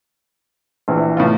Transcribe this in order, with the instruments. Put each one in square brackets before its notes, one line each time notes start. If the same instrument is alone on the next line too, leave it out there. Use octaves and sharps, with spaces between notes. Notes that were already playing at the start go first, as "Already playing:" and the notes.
[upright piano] A#1 E3
[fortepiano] A2 B3 F4